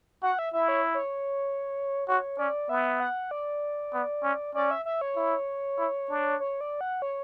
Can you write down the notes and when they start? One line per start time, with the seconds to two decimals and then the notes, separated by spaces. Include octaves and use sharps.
0.22 F#4 F#5
0.39 E5
0.53 E4 E5
0.68 C#5
0.94 C#5
2.08 F#4 C#5
2.39 C#4 D5
2.69 B3 E5
3.00 F#5
3.31 D5
3.94 B3
4.23 C#4
4.55 C#4 D5
4.71 E5
4.85 E5
5.01 C#5
5.16 E4
5.78 E4
6.09 D4
6.40 C#5
6.61 D5
6.81 F#5
7.02 C#5